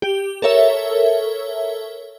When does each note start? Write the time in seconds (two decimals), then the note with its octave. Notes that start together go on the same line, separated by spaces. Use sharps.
0.02 G4
0.42 A4 A#4 C#5 E5